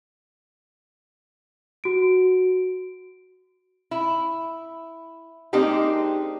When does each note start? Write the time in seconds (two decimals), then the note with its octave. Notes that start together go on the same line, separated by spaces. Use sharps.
1.84 F#4 D7
3.91 E4
5.53 G#3 A#3 C4 D4 D#4 G4